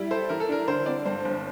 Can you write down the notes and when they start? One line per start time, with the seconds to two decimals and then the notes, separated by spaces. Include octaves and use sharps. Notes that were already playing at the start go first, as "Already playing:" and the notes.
Already playing: G3 E4
0.11 A4 C5
0.29 E3 A#4
0.40 A4
0.49 D4 A#4
0.68 D3 C5
0.86 C4 D5
1.06 G2 C5
1.25 G1